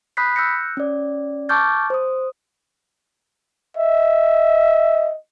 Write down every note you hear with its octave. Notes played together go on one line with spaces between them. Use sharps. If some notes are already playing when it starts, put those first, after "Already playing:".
B5 D#6 F#6 G6 B6 C7
E6 F#6 G6 A#6 C#7
C#4 D5
A5 C#6 D6 F6 G6 A6
C5 D#6
D#5 E5